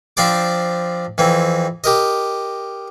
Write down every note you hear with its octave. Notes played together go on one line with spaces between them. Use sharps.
F3 C4 D4 D5 D6
F2 E3 C4
G4 A#4 D#5